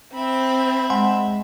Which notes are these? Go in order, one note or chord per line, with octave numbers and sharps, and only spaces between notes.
C4 E5 B5
G#3 F#5 G#5 C6